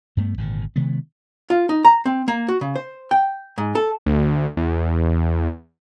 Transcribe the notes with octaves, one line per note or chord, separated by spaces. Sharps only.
G2 A3 B3
G#1 A#2 D3
C3 D#3 G#3 B3
F4
D#4
A#5
C4
A#3
F#4
C#3
C5
G5
G#2
A4
D2
E2